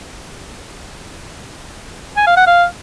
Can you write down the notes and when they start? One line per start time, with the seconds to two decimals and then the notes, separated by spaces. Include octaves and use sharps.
2.17 G#5
2.27 F5
2.37 F#5
2.47 F5